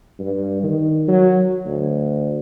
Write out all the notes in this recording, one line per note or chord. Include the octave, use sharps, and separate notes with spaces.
G2
D#3
F#3
D2